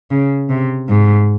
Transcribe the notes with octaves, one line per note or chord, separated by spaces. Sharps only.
C#3
C3
G#2